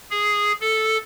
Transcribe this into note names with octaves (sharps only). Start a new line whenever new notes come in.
G#4
A4